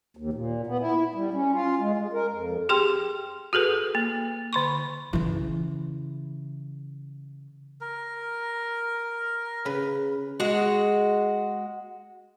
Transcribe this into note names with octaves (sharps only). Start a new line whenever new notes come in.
D#2
A#2
B3
E4
G3
C#4
F4
G#3
G#3
A#4
F2
G4 G#4 G5 C6
F#4 G#4 A4 B4
A#3
D3 C6 C#6
C#3 E3
A#4
C#3 B4
G#3 F#4